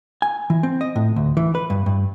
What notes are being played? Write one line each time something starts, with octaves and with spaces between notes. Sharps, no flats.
G#5
E3
C4
D#5
A2
D2
E3
B4
G2
G2